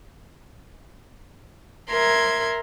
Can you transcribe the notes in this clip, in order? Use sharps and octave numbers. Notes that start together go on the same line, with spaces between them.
A#4 E5 C6 G#6